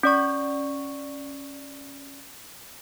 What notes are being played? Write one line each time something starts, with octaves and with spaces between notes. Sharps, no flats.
C#4 D5 C#6